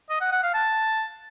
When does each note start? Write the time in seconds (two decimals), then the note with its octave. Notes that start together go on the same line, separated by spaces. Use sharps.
0.10 D#5
0.21 F#5
0.32 F#5
0.43 F5
0.54 A5